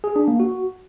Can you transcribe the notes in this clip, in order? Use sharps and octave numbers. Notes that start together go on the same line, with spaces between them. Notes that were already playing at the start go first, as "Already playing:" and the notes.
G#4
D4
A#3
F#4